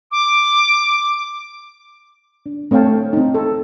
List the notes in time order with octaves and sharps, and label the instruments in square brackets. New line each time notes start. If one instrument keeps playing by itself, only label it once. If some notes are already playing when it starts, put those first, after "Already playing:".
[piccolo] D6
[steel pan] D4
A3 C4 C#5 F5 G5 A5
C4 D#4
A4